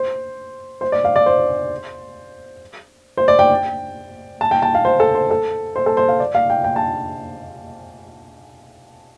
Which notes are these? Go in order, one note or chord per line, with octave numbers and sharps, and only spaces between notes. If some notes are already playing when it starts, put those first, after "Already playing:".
Already playing: C5
C5
D5
F5
D5
C5
C5
D5
G5
A5
G5
A5
F5
C5
A4
C5
A4
C5
A4
C5
F5
D5
F5
G5
G5
A5